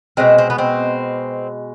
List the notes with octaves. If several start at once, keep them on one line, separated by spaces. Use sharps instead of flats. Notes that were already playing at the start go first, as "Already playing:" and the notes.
B2 G#3 C4
C4
B3
C4